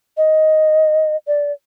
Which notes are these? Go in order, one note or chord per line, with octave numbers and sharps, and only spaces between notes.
D#5
D5